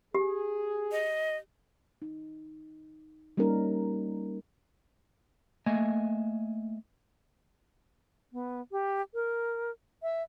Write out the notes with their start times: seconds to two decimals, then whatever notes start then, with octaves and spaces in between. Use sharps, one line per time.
0.15 G4 G#4
0.92 D#5
2.02 D#4
3.37 G3 A#3 C#4 D#4 A#4
5.66 A3 A#3 D#5 E5 G#5
8.33 B3
8.72 G4
9.14 A#4
10.03 E5